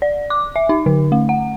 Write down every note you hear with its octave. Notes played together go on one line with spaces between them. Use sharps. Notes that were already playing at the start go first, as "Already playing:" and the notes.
D5
D6
E5
D#4
D3
A3
F#5